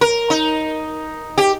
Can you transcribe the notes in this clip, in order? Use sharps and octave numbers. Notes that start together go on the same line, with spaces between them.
A#4
D#4
G4